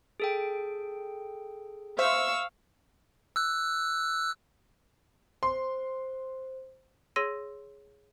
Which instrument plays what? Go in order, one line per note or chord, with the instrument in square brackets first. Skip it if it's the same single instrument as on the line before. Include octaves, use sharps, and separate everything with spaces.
[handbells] G#4 A4 G5
[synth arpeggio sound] C5 E5 [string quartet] F5 C#6 E6
[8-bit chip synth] E6 F#6
[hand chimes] C5 [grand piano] C6
[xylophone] G#4 C#5 C6 E6 A#6 D#7